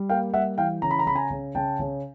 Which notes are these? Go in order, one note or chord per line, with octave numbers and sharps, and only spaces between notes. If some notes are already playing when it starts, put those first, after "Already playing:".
Already playing: G3
A#3 F5 G5
G3 E5 F#5
E3 F5 G5
C#3 A#5
B5
A#5
C#3 B5
G#5 A#5
C#3
C#3 G5 A5
C#3